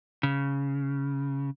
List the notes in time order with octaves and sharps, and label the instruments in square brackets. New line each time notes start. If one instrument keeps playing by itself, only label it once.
[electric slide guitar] C#3